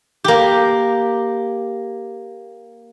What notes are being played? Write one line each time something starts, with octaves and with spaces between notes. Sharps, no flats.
A#3 G4